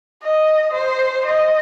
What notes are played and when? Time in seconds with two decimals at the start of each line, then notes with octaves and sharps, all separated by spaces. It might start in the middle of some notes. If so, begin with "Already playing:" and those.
0.22 D#5
0.74 C5
1.26 D#5